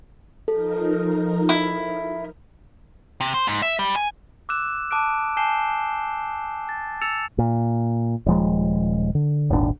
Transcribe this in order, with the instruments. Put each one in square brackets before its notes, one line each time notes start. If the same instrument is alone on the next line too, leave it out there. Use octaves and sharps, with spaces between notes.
[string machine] F3 D#4 A#4 [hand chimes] A4
[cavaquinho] E4
[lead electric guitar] C3
C5
G#2
E5
G3
G#5
[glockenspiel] D6 E6 F#6 E7
A5 D6 D#6 F#6 D7
G#5 A5 G6 C7 E7 G7
A6
E6 A6 C#7 E7 F7
[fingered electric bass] A#2
D#1 F3 G#3
D3
D#1 G#1 C#4 D4